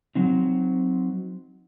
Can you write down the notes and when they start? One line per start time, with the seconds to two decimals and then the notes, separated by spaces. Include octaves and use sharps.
0.15 F#3 C4 D#4